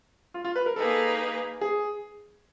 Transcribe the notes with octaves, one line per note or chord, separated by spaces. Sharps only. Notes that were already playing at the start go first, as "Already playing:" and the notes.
F4
F4
B4
A#4
A#3 D#4 G#4 A4 B4
G#4